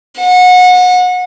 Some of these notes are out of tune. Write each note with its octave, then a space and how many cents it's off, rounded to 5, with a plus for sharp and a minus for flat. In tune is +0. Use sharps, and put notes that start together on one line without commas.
F#5 -30